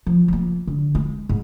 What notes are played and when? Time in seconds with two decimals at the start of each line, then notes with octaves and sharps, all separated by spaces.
0.06 F3
0.28 F3 A#3
0.67 D3
0.95 G#3
1.29 G#2